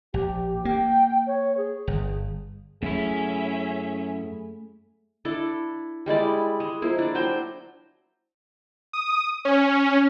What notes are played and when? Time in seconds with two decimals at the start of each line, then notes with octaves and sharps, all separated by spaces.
0.14 A#1 G4
0.65 A#3 G5
1.27 C#5
1.57 G#4
1.87 G1
2.83 F#2 A3 C#4 E4 G#4 E5
5.25 D4 E4 A4
6.06 G3 G#3 E4 D5
6.60 G#3
6.82 F3 A#3 E4
6.99 D4 D5
7.15 F#3 C5 G5 C6
8.93 D#6
9.45 C#4